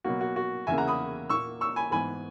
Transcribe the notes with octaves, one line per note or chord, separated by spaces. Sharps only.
B2 F#3 A#3 F#4
F#4
F#4
E2 C#3 E3 A#3 E5 G#5
F#5 A#5
B5 D#6
A#2 A#3 C#6 E6
C#6 E6
G#5 B5
G#2 E3 B3 G#5 B5